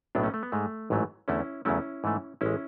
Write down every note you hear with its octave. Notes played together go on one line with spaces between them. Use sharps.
B1 A2 F#3 B3 D4
A3 C#4
A3
B3
G#2 G#3 A3
A1 G#2 F#3 A3
E2 D3 A3 C#4 E4
E2 C#3 F#3 A3 C#4 E4
G#2 E3 A3
A1 G#3 C#4 E4